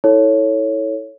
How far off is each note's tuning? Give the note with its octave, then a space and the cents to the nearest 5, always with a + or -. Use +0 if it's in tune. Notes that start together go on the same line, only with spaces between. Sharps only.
E4 -35 A4 +0 C#5 +0